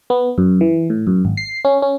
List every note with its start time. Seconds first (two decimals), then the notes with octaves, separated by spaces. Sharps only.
0.10 B3
0.38 F#2
0.61 E3
0.90 A2
1.07 F#2
1.25 G#1
1.37 C7
1.65 C#4
1.82 C#4